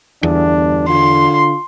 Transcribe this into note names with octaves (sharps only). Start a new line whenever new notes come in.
G1 E2 D4
D3 F4 C6